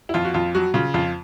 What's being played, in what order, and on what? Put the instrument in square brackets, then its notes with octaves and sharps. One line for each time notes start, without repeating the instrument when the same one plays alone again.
[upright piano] E4
F2 F4
F#4
F2 F4
F#3 F#4
C#3 F4
F2 F4